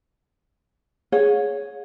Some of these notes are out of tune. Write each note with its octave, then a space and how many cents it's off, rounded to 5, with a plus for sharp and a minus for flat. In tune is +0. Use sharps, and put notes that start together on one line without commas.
G#4 +0 C#5 +0 F5 +45